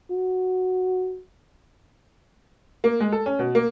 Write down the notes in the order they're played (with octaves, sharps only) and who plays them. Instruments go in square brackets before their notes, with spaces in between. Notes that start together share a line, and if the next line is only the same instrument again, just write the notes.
[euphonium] F#4
[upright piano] A#3
G#3
A4
C#4
B2
A#3